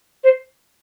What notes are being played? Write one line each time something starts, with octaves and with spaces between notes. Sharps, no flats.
C5